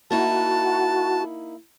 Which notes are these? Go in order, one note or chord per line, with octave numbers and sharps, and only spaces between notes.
A#3 D#4 E4 F#4 A5